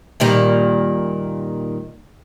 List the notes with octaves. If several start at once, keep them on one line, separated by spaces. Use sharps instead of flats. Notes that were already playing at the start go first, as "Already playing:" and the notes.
A#2 D#3 G3